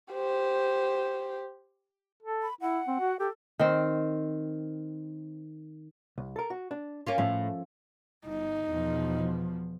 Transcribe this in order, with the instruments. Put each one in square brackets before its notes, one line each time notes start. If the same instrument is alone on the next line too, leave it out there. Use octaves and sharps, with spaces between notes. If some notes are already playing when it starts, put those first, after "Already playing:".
[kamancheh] G4 C5
[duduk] A4
[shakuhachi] B5
[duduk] E4 [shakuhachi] F#5
[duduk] C4
F#4
[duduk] G4 [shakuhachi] A4
[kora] D#3 C4
[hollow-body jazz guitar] C2
A4 A#4
F#4
D4
[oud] A#3 C#4 F4
[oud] A2 [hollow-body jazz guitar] F3 A3 C#4
[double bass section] G1 [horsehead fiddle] D#4
[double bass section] E2 B2 F3